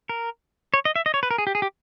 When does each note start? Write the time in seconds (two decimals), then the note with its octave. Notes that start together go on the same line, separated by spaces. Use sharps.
0.09 A#4
0.74 C#5
0.85 D#5
0.96 E5
1.06 D#5
1.14 C#5
1.23 B4
1.31 A#4
1.38 G#4
1.47 G4
1.55 G#4
1.62 G4